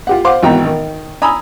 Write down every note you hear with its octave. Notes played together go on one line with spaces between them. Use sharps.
F4 G4 F#5
C5 F5 F#5 C6 D6
G#1 B2 E3 F#4 G5 A#5
D#3
G#5 A#5 B5 D#6 E6